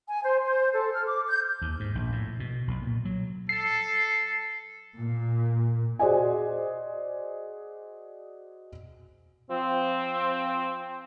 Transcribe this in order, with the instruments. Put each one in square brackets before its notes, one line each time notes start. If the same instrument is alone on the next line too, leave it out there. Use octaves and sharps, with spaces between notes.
[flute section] G#5
C5
C5
A4
F6
D6
G6
[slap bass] D#2
G#2
A#1
A2
B2
B1
A#2
F#3
[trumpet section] A4 [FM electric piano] C7
[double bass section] A#2
[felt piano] F#4 G#4 C5 D5 D#5 G#5
[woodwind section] F3 C4